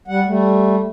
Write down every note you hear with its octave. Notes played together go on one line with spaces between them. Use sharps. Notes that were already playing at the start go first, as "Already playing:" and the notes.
G3 F#5
G3 A3